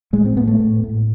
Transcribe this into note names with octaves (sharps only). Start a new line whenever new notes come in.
A2 G#3
C4
A2 B3
A3
A2
A2